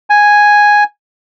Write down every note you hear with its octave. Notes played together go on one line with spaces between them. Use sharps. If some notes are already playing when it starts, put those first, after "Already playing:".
G#5